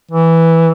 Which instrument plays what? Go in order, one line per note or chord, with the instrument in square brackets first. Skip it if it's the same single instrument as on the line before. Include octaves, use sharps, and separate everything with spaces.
[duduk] E3